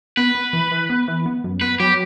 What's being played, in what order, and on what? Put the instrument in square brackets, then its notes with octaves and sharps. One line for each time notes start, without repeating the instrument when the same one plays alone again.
[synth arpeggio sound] B3 [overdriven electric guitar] B4
[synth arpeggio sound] B3
E3
E3
B3
E3
B3
F#2
[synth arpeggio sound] B3 [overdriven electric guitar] B4
[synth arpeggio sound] F#3 [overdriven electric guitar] G4